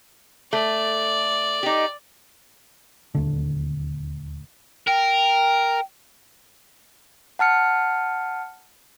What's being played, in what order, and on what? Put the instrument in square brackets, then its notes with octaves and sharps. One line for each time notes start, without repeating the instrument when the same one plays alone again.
[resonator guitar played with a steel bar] A3 [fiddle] D5
[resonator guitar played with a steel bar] D#4 G4
[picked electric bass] D#1 D2 D3
[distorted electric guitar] A#4 [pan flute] G5
[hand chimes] F#5 A5 F6 C#7